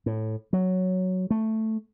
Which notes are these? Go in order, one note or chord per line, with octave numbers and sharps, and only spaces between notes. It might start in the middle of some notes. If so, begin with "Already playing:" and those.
A2
F#3
A3